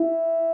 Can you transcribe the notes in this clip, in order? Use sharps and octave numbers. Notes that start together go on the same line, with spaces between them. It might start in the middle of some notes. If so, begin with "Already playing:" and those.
Already playing: E4